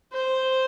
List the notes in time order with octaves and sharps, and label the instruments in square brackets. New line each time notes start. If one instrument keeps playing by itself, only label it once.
[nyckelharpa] C5